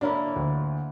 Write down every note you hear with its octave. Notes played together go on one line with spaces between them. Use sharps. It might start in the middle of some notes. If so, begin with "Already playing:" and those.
D3 A#3 D4 E4 C#5
D2